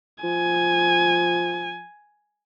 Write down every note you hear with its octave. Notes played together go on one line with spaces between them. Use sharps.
F3 G#5